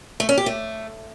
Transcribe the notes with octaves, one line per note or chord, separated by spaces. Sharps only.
A3
C#4
G4
A3